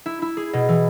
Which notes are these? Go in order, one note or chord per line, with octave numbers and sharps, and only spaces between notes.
E4
E4
G#4
B2
E3